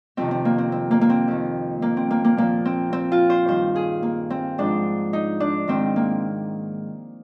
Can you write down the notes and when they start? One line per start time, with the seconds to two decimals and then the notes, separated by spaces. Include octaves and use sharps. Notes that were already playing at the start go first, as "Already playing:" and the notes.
0.17 F2 C3 D#3 C4
0.31 C4
0.45 A#3
0.58 C4
0.72 C4
0.91 A#3
1.01 A#3
1.10 C4
1.28 F2 D#3
1.82 A#3
1.97 C4
2.11 A#3
2.24 A#3
2.37 A#2 F3 A#3
2.65 C4
2.93 C4
3.12 F4
3.30 C5
3.48 G2 D#3 C5
3.76 G#4
4.03 A#3
4.30 C4
4.58 G#2 F3 D4
5.13 D#4
5.40 D4
5.68 G#2 D#3 C4
5.96 A#3